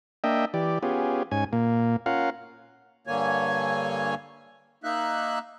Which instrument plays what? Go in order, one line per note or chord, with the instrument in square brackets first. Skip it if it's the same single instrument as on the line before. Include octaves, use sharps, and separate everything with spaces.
[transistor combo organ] A#3 D4 D#5 E5 G5
E3 G4 D5
B3 C#4 F4 G4 G#4
G#2 C#4 G#5
A#2 A#3
C#4 F4 A#4 F5 F#5
[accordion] G2 D3 A#3 C#5 G#5
A#3 D#4 E5 F#6